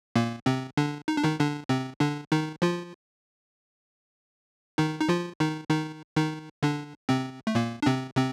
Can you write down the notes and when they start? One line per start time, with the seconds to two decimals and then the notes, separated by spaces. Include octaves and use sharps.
0.16 A#2 A#3
0.46 C3 C4
0.77 D3 D4
1.08 D#4
1.17 D4
1.24 D#3 D#4
1.40 D3 D4
1.69 C3 C4
2.00 D3 D4
2.32 D#3 D#4
2.62 F3 F4
4.78 D#3 D#4
5.01 D#4
5.09 F3 F4
5.40 D#3 D#4
5.70 D#3 D#4
6.17 D#3 D#4
6.63 D3 D4
7.09 C3 C4
7.47 A3
7.55 A#2 A#3
7.82 D4
7.86 C3 C4
8.17 C3 C4